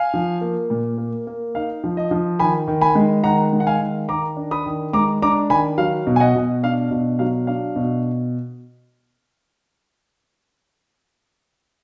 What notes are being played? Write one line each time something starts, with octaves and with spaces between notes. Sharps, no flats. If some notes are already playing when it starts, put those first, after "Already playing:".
Already playing: F5 G#5
F3
A#3
A#2
A#3
A#3
D#4 F5
F3
D#5
F3
D#3 G#5 B5
D#3
G#5 B5
G#3
D#3 F#5 A#5
G#3
F#5
F5 G#5
D#3
D#3 A#5 D6
D4
B5 D#6
D#3
G#3 A#5 D6
D4 A#5 D6
D#3 G#5 B5
F#3 F5
B2
G#5
D#5 F#5
B2
D4 F5
B2
F#3 F5
D4 F5
B2